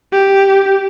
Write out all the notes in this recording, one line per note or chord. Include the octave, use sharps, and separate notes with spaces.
G4